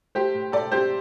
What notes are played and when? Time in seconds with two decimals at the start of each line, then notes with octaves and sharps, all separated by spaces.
0.15 A3 G4 C5
0.34 A2
0.52 A2 A4 D5
0.71 C4 G4 C5